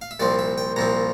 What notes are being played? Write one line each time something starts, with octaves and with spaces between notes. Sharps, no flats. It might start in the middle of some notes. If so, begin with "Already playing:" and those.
F5
E5
C2 A#2 F3 C4 D5
E5
G5
C2 A#2 F3 C4 A#5